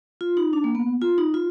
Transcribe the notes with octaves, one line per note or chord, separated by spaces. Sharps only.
F4
D#4
D4
A#3
B3
F4
D#4
F4